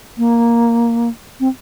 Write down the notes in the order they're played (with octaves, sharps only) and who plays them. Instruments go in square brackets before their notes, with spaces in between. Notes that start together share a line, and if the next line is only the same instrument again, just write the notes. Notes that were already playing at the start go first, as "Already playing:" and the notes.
[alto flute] A#3
C4